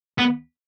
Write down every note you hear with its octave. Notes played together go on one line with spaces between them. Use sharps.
B3